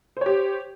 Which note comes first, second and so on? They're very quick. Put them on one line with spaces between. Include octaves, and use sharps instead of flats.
C5 C#5 G4